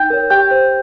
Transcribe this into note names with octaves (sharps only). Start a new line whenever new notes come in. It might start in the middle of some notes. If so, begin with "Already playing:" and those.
Already playing: D#4 G5 G6
A#4 C#5
G4 G5 G6
C5